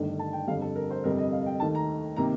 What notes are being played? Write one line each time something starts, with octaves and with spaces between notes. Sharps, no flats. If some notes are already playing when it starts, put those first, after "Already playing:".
Already playing: G1 G2 D#3 A3
A5
G5
G1 F2 D3 G3 F5
A4
A#4
C5
G1 F2 C3 G3 A#4
D#5
F5
G5
D#2 D#3 A3 A5
A#5
C3 D#3 A#3 A#5